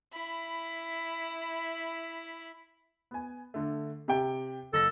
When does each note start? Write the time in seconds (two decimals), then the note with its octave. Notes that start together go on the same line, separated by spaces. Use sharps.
0.13 E4 B5
3.11 B3 G#5
3.54 D3 A3
4.08 C3 G4 G5
4.73 F#1 A4 A#6